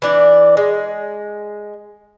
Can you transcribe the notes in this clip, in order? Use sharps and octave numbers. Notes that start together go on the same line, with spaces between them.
E3 D4 D5
G#3